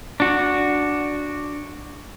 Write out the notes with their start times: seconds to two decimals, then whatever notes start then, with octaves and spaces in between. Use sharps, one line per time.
0.20 D4 F#4